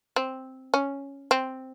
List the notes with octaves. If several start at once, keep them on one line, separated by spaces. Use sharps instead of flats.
C4
C#4
C4